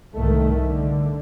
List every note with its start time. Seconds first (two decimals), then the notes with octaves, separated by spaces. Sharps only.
0.14 C2 G#2 D#3 A3
0.65 D3